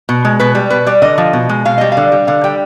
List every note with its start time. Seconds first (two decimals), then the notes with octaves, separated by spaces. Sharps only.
0.09 B2
0.25 G#3
0.40 B2 B4
0.55 G3
0.70 B2 B4
0.86 G3 D5
1.02 D3 D#5
1.18 F3
1.33 B2
1.49 G#3
1.65 B2 F5
1.78 G3 D#5
1.92 F5
1.97 D3
2.12 G3
2.27 D3 F5
2.44 G3 G5